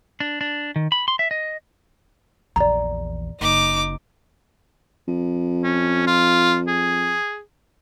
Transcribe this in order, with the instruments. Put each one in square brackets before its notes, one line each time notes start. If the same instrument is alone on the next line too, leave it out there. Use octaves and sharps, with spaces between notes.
[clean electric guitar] D4
D4
D#3
B5
C6
E5
D#5
[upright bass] A#1 E2 [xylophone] D5 A#5
[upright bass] F#1 [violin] D#4 D6
[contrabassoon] F2
[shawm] C#4
F4
G#4